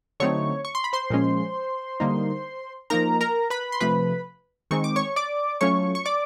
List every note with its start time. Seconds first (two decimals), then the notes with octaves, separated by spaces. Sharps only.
0.20 D3 F#3 A3 C4 D#4 C#5 C#6
0.65 C#6
0.75 C6
0.84 B5
0.93 C5 C6
1.10 A#2 F3 G#3 C#4
2.00 D3 G3 A#3 D#4
2.90 F3 A#3 D#4 A#4 A#5
3.21 A#4 A#5
3.50 B4 B5
3.72 C6
3.80 C3 F3 A3 B4 B5
4.71 D#3 G#3 C4 D#4 C#6
4.84 D6
4.96 C#5 C#6
5.16 D5 D6
5.61 F#3 A3 C#4 F4 C#5 C#6
5.95 C#6
6.06 D5 D6